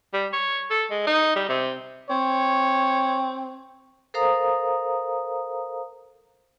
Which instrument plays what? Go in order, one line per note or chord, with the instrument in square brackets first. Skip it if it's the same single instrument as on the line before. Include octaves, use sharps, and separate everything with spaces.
[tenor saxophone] G3
C#5
A4
G#3
D#4
G3
C3
[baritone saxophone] C4 [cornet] C#5
[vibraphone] A4 A#4 C5 F5 A#5 D#6